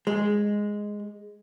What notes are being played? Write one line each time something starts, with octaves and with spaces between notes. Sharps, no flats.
G#3